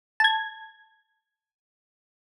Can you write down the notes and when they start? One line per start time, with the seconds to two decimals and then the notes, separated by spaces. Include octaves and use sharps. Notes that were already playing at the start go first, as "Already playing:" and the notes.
0.20 A5 G#6